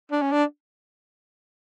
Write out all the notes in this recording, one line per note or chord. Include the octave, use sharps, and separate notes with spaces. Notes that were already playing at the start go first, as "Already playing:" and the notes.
D4
C#4
D4